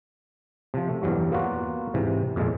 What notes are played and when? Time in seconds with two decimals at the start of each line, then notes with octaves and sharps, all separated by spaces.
0.74 C3 F3
0.89 A3
1.02 E2 G2 E3 F#3 G3
1.32 A#3 B3 F4 F#4
1.94 G#2 C3 E3
2.36 F2 A#2 G#3